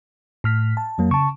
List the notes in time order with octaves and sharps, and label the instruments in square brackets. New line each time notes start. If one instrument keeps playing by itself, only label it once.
[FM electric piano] A2 F6 B6
A5
[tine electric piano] F2 F#3 A#3
[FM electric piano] C#3 [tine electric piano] A5 C#6